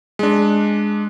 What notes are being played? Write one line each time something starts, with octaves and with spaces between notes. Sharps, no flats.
G#3 D4